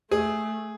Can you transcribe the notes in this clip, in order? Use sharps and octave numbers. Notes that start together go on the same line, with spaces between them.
A3 G#4